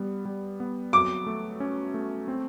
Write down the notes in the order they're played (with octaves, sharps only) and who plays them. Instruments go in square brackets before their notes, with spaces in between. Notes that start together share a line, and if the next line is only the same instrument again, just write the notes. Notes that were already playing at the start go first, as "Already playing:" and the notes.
Already playing: [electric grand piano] G3 B3
G3
B3
[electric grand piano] F#3 [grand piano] D6
[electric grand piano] A3
C#4
A3
C4